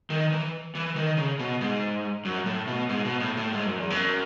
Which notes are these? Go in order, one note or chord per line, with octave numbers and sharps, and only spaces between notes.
D#3
E3
E3
D#3
C#3
B2
G#2
F#2
A2
B2
G#2
B2
A2
A2
G#2
F#2
E2
F#2